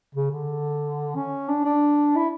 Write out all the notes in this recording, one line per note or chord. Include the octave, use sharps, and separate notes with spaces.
C#3
D3
C#4
D4
D4
E4